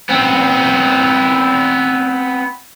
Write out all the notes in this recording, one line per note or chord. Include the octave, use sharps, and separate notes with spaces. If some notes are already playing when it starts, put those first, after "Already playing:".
B3 C4